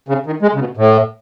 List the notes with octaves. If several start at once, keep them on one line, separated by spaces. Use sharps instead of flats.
C#3
D#3
G#3
C#3
B2
A2